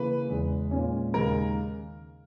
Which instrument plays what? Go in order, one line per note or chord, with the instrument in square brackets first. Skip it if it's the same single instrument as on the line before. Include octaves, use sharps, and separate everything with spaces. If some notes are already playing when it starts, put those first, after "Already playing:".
Already playing: [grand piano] C#3 E3 A#3 [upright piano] B4
[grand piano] E2 C#3 E3 G#3
A#2 G#3 C#4
[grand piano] D#2 C#3 G#3 D#4 [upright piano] A#4